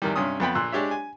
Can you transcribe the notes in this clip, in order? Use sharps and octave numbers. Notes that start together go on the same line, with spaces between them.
E2 D#3 G3
G2 C3 C#4 D#6
F2 B3 G5 B5
A#1 A#2 E6 F#6
G#3 D4 G4 C#5 E5
G#5